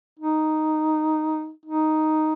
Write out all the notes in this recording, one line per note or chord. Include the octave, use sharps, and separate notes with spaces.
D#4
D#4